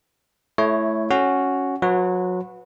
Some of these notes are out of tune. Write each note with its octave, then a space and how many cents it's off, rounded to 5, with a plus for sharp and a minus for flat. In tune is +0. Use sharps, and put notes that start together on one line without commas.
A3 -15 E4 +5 C#5 +0
C#4 +0 F#4 +0
F#3 -25 F#4 -25 B4 +0